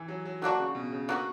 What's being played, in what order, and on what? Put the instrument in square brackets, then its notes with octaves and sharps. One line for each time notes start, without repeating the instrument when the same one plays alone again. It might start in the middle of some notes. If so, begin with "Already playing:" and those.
Already playing: [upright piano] E3
F#3
F#3
[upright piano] D3 [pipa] F#3 A#3 D4 F#4
[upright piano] C#3
B2
C#3
[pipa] B2 A#3 C#4 F#4 [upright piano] D3